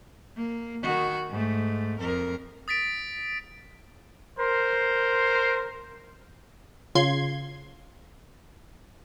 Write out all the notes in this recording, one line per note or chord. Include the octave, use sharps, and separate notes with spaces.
A#3
D#3 F#4
G#2 A3
F2 A#4
D#6 A6 B6 D7
A#4 C5 C6
C#3 F4 C6 G#6